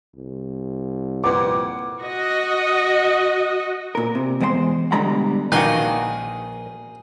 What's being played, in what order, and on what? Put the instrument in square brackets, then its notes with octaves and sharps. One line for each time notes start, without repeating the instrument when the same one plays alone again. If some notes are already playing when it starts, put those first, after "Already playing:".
[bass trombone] C2
[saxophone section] F2 A#2 F#5 [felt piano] B4 D6
[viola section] F#4 D#5
[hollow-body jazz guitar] A#2 A#4
C3
E2 G#3 C5 F#5 C6
B2 D3 G3 G#3 A#5 B5
[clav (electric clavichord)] A#1 F#4 D5 [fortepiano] D#3 [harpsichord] G#4 C6 [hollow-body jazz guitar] B4 F5